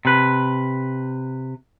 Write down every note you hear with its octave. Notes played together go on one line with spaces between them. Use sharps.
C3 B4